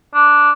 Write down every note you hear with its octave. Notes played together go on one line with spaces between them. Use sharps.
D4